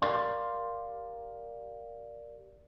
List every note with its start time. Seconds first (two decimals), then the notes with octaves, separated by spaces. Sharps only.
0.02 G4 A#4 D5 F5 C6